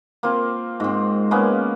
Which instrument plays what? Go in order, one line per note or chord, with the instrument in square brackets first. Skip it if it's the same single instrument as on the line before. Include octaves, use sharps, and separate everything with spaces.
[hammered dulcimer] A#3 C4 F4
G#2 C4
G#3 A#3 B3 C#4